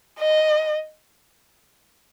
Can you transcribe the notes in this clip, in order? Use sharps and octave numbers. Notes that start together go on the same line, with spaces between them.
D#5